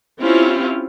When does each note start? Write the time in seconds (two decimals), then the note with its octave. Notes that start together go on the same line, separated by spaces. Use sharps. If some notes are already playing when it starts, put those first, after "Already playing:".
0.20 C4 C#4 E4 F4 G4